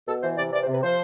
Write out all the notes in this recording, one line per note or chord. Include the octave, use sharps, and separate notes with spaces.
B2 A4
E3 C5
C3 D5
E3 D5
C5
C3 B4
F3 C5